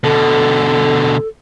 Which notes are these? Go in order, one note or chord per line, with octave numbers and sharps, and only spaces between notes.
B2 D3 A4